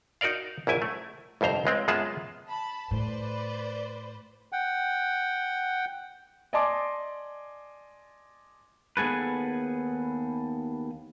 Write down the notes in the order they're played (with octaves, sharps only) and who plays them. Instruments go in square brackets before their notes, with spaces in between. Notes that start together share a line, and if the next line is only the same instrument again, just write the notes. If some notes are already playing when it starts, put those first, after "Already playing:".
[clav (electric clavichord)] D#4 F#4 A#4 D5 F5
A#1 F#2 E4 G#5
A3
G1 C2 F2 C5 A#5
C#2 G#3 C4
F#2 G#3 B3 F4 G#4 A5
[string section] A5 B5
[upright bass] A2 [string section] B4 C5 D5
[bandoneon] F#5 G5
[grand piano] D5 D#5 G#5 A5 C6 D6
[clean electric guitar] D#2 B3 G#4 A4 B4